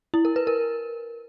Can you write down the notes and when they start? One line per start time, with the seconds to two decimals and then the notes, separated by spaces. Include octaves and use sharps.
0.14 E4
0.25 A#4
0.36 B4
0.47 A#4